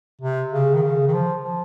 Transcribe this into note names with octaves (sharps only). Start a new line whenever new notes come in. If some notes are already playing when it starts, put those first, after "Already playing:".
C3
C#3
D#3
C#3
D#3
F3
F3